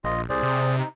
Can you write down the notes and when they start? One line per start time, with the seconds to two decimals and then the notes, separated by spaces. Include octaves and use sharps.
0.04 A#1 F4 D#5
0.29 C2 G#4 C5 D5
0.43 C3
0.77 D#4